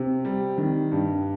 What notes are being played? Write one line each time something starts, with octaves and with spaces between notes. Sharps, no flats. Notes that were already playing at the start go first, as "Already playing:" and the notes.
Already playing: C3
G3
D#3
G2